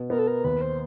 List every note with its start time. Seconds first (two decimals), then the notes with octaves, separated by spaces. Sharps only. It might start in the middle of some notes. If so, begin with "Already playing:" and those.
Already playing: B2 B3
0.10 B3 A#4
0.19 A4
0.27 A#4
0.44 D#2 B4
0.61 C5